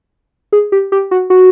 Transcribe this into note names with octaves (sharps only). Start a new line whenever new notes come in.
G#4
G4
G4
F#4
F#4